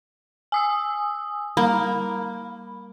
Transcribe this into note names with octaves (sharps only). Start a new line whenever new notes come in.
G#5 D#6 E6
G3 A#3 B5